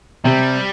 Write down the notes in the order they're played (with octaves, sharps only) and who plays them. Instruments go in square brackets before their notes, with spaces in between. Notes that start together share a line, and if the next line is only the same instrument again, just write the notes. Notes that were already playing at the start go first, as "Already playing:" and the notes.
[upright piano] C3 [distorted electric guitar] G3